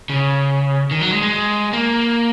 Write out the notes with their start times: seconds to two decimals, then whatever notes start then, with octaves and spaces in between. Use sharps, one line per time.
0.09 C#3
0.91 D#3
1.01 F#3
1.11 G#3
1.22 G#3
1.73 A#3